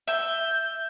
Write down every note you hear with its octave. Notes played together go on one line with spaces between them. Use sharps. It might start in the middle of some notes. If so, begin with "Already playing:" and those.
E5 E6 G6